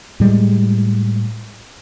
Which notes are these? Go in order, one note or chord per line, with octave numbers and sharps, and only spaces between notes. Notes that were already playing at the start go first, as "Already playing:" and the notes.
A2 G3 G#3